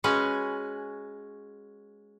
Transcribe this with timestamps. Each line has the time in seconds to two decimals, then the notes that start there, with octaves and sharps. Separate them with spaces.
0.04 G#3 C#4 F#4 B4 G#5